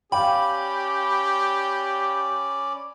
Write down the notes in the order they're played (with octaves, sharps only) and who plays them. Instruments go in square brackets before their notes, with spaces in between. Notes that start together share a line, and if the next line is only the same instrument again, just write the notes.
[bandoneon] C#4 D5 [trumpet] G4 [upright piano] F5 G5 [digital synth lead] B5